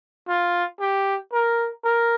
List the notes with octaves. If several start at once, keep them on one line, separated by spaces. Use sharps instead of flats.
F4
G4
A#4
A#4